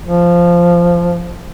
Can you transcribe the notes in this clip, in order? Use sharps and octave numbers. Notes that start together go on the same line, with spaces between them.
F3